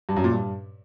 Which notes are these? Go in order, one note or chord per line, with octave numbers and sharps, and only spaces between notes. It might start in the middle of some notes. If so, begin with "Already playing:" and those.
G2
F#2
A#2
G2